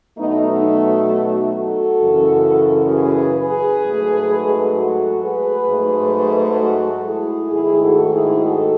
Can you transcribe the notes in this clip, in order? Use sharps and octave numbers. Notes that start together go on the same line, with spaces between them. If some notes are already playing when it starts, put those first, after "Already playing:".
B2 F#3 A3 B3 D#4
B3 D#4
D#4 F#4
F#4 A4
F#2 C#3 E3
G#4 B4
G#4 B4
G#2 F#3 A3
F#4 A4
G#4 B4
G#2 F#3 A3
F#4 A4
E4 G#4
G#2 D#3 A3 E4 G#4
F#4 A4
E4 G#4
F#4 A4